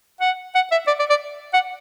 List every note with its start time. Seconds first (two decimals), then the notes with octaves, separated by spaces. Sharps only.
0.21 F#5
0.55 F#5
0.72 E5
0.87 D5
1.00 D5
1.10 D5
1.54 F#5